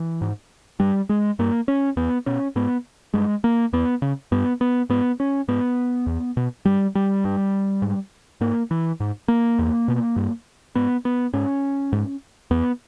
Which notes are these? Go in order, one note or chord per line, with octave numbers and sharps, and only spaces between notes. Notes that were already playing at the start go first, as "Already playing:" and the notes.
Already playing: E3
G#2
G2 G3
G#3
G2 A#3
C#4
E2 B3
B2 C#4
G#2 B3
G2 G#3
A#3
E2 B3
C#3
G2 B3
B3
G#2 B3
C#4
G#2 B3
E2
B2
G2 G3
G3
G2
G#2
G#2 A#3
E3
G#2
A#3
E2
B2
G2
G#2 B3
B3
G#2 C#4
G#2
E2 B3